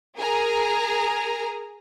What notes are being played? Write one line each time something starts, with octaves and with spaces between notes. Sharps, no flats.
G#4 A#4 G#5 A#5